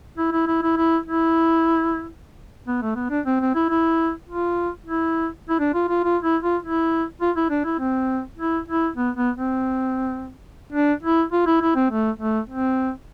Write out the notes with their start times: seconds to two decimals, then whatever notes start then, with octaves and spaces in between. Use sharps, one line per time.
0.18 E4
0.32 E4
0.47 E4
0.62 E4
0.77 E4
1.06 E4
2.68 B3
2.82 A3
2.96 B3
3.10 D4
3.26 C4
3.40 C4
3.55 E4
3.70 E4
4.29 F4
4.86 E4
5.49 E4
5.59 D4
5.74 F4
5.89 F4
6.04 F4
6.23 E4
6.43 F4
6.63 E4
7.21 F4
7.37 E4
7.50 D4
7.65 E4
7.80 C4
8.38 E4
8.68 E4
8.97 B3
9.17 B3
9.36 C4
10.73 D4
11.03 E4
11.32 F4
11.47 E4
11.61 E4
11.75 C4
11.90 A3
12.19 A3
12.49 C4